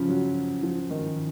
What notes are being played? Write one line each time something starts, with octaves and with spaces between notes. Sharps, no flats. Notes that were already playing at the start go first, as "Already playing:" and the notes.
Already playing: C#3 F3
F#3
F3
D#3